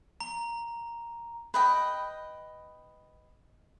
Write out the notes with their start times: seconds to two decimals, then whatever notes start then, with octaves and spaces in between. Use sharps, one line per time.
0.20 A#5
1.54 B4 D#5 G5